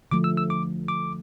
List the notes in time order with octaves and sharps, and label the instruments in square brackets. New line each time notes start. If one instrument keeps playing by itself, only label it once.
[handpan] D3 F3 A3 [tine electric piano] D6
[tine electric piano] E6
E6
D6
D6